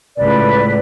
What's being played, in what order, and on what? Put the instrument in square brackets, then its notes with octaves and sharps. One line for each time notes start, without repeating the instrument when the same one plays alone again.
[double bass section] C#2 A2 [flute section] B4 D5